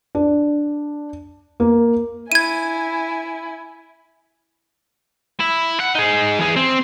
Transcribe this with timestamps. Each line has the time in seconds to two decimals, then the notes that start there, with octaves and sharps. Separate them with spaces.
0.15 D4
1.60 A#3
2.32 E4 G#5 G#6 D#7
5.40 E4
5.80 F#5
5.95 D#4 G#4
6.39 E3 G#4
6.56 C4